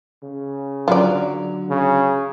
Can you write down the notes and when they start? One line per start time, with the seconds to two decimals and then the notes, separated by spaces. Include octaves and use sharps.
0.23 C#3
0.88 D3 F#3 F4 D5
1.69 C#3